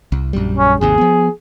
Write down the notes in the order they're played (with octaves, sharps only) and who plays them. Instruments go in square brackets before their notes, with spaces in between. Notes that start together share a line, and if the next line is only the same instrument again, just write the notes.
[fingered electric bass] C2
A#1 F#2 G3
[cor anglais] C#4
[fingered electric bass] G#1 D#2 C3 [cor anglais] G#4
[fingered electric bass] F3 B3